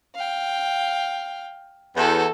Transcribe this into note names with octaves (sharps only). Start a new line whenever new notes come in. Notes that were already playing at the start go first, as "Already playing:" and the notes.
F5 G5
E2 F#4 A4